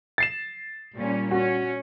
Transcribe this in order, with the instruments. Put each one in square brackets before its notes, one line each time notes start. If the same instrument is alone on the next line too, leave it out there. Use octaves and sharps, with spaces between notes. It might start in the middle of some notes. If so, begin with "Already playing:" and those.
[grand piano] A6 C7 E7
[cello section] A#2 G3 C#4
[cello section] C#4 [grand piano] F#4